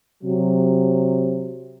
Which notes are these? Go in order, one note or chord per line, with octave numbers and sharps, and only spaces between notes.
C3 F#3